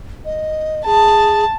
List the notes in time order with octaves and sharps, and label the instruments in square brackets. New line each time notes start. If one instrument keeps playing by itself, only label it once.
[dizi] D#5
[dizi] G#4 [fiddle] A5